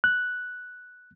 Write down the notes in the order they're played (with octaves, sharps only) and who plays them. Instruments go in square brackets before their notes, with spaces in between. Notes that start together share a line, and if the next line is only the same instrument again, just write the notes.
[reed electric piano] F#6